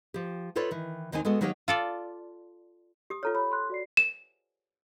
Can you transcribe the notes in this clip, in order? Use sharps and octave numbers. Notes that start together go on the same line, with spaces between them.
F3 G4
D#4 F4 A4 B4 C#5 D5
D#3 E3
D#2 D#3 A#3 C4 D#4 G#5
G#3 B3 F#4 A4
D#3 F#3 A#3 D#4 G4 C#5
F4 A4 D5
G4 D#6
F4 A4 C#5 A#5 F6
C#5 B5
C6 F#6
F#4 D5 C7
E7